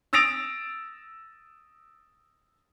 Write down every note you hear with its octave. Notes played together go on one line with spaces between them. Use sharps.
D#6 E6 A6 A#6 D7 F7